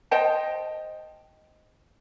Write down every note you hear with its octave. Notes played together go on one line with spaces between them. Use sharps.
C5 D#5 G5 A5